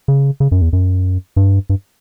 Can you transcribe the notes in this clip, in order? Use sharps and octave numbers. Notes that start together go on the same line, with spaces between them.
C#3
C#3
F#2
E2
F#2
G2
G2